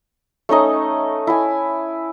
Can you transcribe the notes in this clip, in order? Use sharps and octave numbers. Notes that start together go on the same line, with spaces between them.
A3 C#4 D#4 D#5
E4 G#5